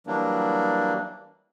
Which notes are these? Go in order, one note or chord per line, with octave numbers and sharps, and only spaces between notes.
E3 F#3 G3 A#3 D4